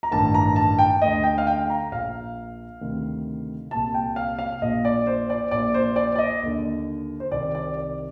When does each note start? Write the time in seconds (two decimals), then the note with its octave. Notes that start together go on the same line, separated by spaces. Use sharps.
0.03 A#5
0.11 A1 G2 D#3 A5
0.34 A#5
0.56 A5
0.79 G5
1.02 D2 D3 D#5
1.24 G5
1.38 F5
1.47 G5
1.70 A#5
1.91 A#1 A#2 F5
2.81 D2 C3 D#3
3.71 C2 A#2 A5
3.94 G5
4.16 F5
4.39 F5
4.61 A#1 A#2 D#5
4.85 D5
5.07 C5
5.30 D5
5.51 A#1 A#2 D5
5.74 C5
5.96 D5
6.15 D5
6.18 D#5
6.42 D#2 D3
7.20 C5
7.31 C2 C3 D#3 D5
7.55 D5
7.77 D5